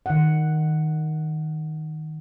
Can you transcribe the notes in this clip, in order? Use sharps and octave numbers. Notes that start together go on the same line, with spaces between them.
D#3 F#5